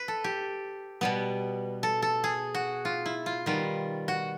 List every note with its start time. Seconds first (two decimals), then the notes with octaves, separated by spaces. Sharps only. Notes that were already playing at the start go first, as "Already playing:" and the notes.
Already playing: B4
0.08 A4
0.24 G4
1.01 B2 G3 B3
1.83 A4
2.02 A4
2.24 G#4
2.54 F#4
2.85 F4
3.06 E4
3.26 F4
3.46 D#3 G3 B3 F4
4.08 F#4